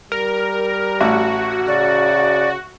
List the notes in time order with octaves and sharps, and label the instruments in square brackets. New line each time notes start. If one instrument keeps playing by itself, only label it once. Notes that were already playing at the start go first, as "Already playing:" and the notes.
[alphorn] G3 [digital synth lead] A#4
[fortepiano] A1 [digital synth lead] F#4
[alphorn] C#3 [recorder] D5